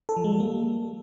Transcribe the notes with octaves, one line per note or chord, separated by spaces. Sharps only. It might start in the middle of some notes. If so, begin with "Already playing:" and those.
A4
F3
G#3
G3
A#3